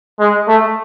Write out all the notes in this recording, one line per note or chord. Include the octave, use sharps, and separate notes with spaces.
G#3
A3